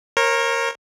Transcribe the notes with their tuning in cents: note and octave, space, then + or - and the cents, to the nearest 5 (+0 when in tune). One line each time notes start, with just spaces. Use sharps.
A#4 +0 C#5 -35